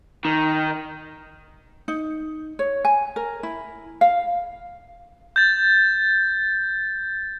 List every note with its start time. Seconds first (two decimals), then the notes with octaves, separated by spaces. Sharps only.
0.25 D#3
1.88 D#4
2.59 C#5
2.85 G#5
3.16 A#4
3.43 E4
4.01 F5
5.36 G6 A6